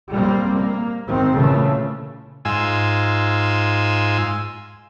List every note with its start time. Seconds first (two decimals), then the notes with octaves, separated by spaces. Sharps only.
0.11 G3 A#3 C4
0.55 A#3
1.05 G#1 D#3 C4
1.35 A#2 C#3 E3 A3
2.45 G#2 F4 G#5 E6